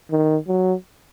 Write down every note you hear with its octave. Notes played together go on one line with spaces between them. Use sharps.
D#3
F#3